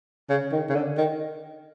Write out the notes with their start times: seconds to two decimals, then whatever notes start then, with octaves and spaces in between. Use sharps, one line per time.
0.30 C#3
0.52 D#3
0.69 C#3
0.75 D3
0.98 D#3